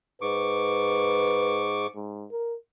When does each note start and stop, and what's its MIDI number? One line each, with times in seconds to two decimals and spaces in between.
0.21 1.87 44
0.21 1.75 71
0.21 1.87 85
0.21 1.87 86
1.95 2.25 44
2.31 2.55 70